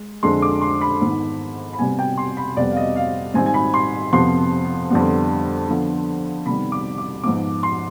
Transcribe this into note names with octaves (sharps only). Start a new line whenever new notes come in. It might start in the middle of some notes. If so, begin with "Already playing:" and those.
Already playing: G#3
F2 D3 G#3 C6
D6
C6
B5
G#2 D#3 B3
B5
C3 G3 B3 G#5
G5
C6
B5
F2 C3 G3 B3 D5
F5
D#5
F5
G#2 D#3 G3 C4 G#5
G#5
B5
C6
F2 C3 F3 B3 C6
F2 D3 G3 B3
D3 F3 B3
C3 D#3 G3 B3 B5
D6
D6
G#2 F3 B3 D6
C6